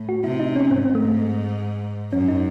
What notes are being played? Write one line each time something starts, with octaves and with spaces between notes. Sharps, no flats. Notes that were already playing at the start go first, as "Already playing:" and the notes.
Already playing: A2
F#4
C3 E4
D#4
C#4
G#2 C4
C4
A3
F#2 C#4
D#4